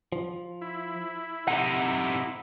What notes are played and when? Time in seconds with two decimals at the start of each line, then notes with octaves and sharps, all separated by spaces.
0.12 F3
0.61 E4
1.48 C3 D#4 F#5